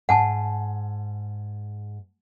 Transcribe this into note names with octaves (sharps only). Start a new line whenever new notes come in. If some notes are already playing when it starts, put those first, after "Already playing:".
G#2 F#5 G#5 A5